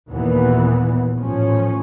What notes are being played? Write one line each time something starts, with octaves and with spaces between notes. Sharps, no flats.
D#2 A#2 E3 B3
A1 F3 C#4